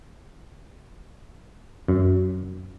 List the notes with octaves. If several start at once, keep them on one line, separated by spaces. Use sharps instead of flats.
F#2